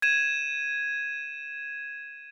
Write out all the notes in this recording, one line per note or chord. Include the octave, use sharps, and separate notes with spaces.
G#6 D#7 E7